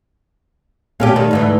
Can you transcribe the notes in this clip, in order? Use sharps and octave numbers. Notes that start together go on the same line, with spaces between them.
A#2 A3 C#4 G4
D#3 G3
D2 G#2 E3